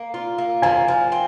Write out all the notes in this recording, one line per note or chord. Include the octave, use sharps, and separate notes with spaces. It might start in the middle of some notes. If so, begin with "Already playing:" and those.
Already playing: A#3
F4
A#3
F3 G#5
F3
C4